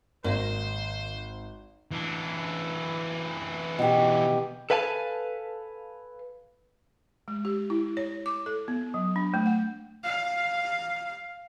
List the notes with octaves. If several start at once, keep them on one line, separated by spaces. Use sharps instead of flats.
G#1 D#3 A#3 C5
E3 D4
B2 G4
A4 B4 F5 G#5 A5
G#3
G4
E4
C#5
D6
A4
B3
F#3
D4
A3
F#5
F5